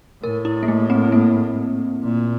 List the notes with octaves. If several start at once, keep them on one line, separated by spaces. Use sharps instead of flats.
A2 A#4
E4
A#3
A3
C4
A#3
A#2